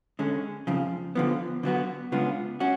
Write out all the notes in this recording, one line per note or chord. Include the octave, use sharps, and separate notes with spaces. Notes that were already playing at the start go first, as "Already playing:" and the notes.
D3 G#3 C#4
F2 C#3 F3
D3 F3 B3
D3 F#3 B3 F#4
C#3 G#3 B3 D4 F4
C#4 F#4